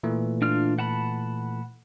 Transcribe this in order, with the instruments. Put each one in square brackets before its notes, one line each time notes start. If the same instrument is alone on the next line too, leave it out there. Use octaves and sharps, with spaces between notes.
[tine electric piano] A#2 E3 A3
[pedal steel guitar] D4 F4 F6
F#5 A5 B5